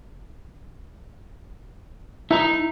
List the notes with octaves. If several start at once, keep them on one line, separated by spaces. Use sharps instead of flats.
D#4 E4 A#5